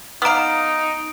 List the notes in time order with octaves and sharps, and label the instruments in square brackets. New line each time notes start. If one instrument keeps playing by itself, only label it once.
[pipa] B3 F5 [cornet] D#4 [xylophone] A#5 D6 F6 [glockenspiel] D#6 D7